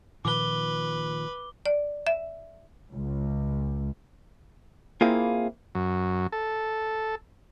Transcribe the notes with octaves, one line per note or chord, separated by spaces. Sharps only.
A#2 D#3 F3 B4 D6 G7
D5
E5
C#2
A#3 C4 E4 F4 G#4 F5
F#2
A4